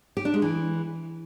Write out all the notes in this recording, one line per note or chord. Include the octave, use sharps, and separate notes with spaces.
G4
D4
G#3
E3